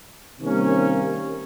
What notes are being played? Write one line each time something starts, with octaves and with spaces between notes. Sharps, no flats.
C3 D#3 G3 A#3 C#4